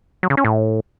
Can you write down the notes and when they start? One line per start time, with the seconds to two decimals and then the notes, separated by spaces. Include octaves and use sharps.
0.23 F#3
0.30 C#3
0.37 C#4
0.45 A2